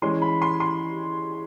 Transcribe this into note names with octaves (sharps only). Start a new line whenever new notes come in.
E3 G#3 C#4 C6
B5
C6
C6